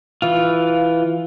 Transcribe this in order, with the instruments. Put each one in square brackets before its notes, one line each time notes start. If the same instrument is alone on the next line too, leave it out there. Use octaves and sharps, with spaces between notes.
[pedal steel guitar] E3 F4